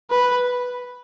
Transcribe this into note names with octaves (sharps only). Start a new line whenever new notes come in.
B4